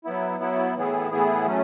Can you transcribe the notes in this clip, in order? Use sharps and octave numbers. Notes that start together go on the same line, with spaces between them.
F#3 B3 E4
F#3 B3 E4
A2 E3 B3 E4 G#4
A2 E3 B3 E4 G#4
F#3 A3 C#4